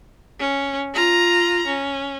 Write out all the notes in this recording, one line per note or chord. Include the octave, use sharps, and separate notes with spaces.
C#4
F4 A#5
C#4